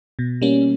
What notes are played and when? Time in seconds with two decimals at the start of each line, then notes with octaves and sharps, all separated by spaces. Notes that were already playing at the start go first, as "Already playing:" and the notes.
0.19 B2
0.42 G3 A#3 C#4